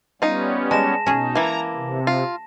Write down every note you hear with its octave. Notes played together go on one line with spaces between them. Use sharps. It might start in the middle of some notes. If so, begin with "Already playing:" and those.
G3 B3 C#4 D#4 F4
G#3 A5 A#6 E7
B2 C#4 D#4 G#4
E3 A#3 A#5
C3
F4